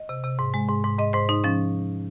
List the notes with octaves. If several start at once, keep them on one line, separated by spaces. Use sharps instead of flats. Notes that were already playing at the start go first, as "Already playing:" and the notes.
Already playing: D#5
C3
C3
G#2
G#3
G#2
G#2
G#2 D#5
G#2 C5
G#2 D#4
F3 C#4